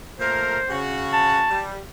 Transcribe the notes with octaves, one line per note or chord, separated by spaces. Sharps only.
A#2 A3 A#4 C5
C#3 F#4
A5
G3